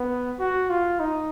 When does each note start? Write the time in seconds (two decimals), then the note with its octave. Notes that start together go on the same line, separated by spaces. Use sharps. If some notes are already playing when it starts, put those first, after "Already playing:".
Already playing: B3
0.40 F#4
0.70 F4
1.00 D#4